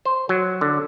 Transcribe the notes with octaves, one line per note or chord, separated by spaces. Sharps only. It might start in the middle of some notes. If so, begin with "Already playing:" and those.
C5
F#3
D3